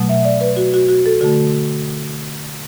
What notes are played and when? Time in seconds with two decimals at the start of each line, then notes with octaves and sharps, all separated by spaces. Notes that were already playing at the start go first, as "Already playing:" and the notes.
Already playing: B2 F#3 A3
0.09 E5
0.25 D5
0.41 B4
0.57 F#4
0.74 F#4
0.89 F#4
1.06 A4
1.21 D3 A3 F#4